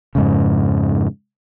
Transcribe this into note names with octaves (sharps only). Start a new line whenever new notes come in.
F2 G#2 C#3